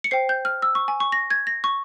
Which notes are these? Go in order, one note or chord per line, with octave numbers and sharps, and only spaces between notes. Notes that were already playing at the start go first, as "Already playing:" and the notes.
C#7
C5 G5 C7
G6
F6
E6
C#6
G#5
C#6
A#6
G#6
A#6
C#6